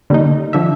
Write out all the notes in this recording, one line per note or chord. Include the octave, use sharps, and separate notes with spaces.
D3 G3 A#3 D#4
D3 F3 E5